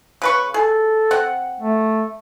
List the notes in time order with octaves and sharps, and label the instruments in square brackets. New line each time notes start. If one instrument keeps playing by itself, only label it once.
[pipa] C#3 B4 C#6
[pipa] G#4 [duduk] A4
[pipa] C4 F#5
[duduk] A3